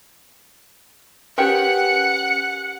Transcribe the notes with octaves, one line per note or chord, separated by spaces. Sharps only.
C#4 G4 A#4 B4 F#5 G5 C#7